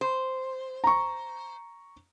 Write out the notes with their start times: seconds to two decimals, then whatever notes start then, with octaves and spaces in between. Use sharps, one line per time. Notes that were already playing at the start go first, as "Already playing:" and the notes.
0.01 C5
0.84 A#5 C#6